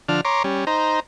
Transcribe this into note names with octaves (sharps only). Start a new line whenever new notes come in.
D3 F3 D4 F6
C#5 A#5 C6 D6
G3 C#4
D#4 C5 A#5